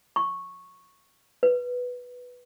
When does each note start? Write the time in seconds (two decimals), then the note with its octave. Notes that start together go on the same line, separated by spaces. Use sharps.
0.16 C#6
1.43 B4